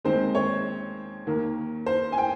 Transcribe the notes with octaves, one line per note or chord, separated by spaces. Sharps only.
D#2 D#3 G#3 C4 C5
C#5
D#2 D#3 A#3
C5
G#5
G5